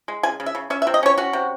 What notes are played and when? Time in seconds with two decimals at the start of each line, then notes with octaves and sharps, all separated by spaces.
0.08 G#3
0.23 C#3 G#5
0.40 C#3
0.46 E5
0.55 C#3
0.70 C#4 E5
0.82 E5
0.87 C3
0.94 D#5
1.03 C#4 C#5
1.18 C#4 F#4
1.33 C3